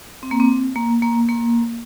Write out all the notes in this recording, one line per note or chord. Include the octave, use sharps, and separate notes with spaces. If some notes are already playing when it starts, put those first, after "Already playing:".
C4
A#3
C4
A#3
A#3
A#3